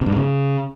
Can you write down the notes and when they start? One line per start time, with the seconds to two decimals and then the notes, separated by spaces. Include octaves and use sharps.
0.01 C3
0.06 G2
0.11 G#2
0.16 C#3